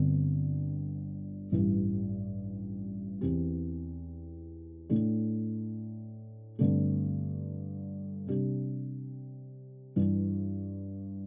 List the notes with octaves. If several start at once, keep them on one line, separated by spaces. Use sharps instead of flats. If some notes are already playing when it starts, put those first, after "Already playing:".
Already playing: G1 G2 D3 C4
A1 G2 E3 G3
E2 E3 C4 G4
A2 A3 D4
G2 D3 A3 C4
C3 G3 D4 G4
G2 E3 G3 D4